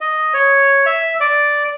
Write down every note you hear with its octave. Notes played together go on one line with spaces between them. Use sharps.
D#5
C#5
E5
D5